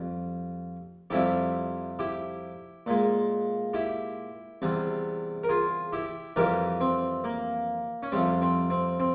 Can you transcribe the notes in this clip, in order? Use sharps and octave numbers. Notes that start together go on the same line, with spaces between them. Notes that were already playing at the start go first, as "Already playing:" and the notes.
Already playing: F2 G3
F2 C3 G3 E4 G4
E4 G4
A#2 G#3
E4 G4
E2 C3 G3
A#4
F4 G#4
E4 G4
F2 E3 G3 G4 A#4
C4
A#3
C#4
F2 C3 G3 C4
C4
C4
C4